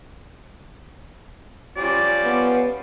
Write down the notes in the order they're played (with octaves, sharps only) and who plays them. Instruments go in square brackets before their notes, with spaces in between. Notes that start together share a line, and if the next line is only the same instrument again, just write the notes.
[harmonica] F3 G3 C#4 [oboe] D5
[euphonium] B3